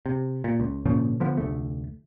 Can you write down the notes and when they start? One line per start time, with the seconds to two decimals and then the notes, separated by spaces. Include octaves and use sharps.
0.06 C3
0.44 A#2
0.60 C#2
0.85 G#1 A#2 C#3 F3
1.20 D3 F3 B3
1.37 F1 D2 A3